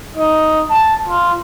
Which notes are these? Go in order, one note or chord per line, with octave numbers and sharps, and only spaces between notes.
D#4
A5
F4